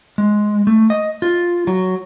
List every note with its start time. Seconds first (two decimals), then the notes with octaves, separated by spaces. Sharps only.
0.18 G#3
0.67 A3
0.90 D#5
1.22 F4
1.67 F#3